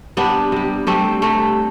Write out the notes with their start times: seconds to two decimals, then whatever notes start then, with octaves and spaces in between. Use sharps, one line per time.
0.17 C3 G3 B3 D4
0.52 C3 G3
0.87 C3 G3 A3 C4
1.22 C3 G3 A3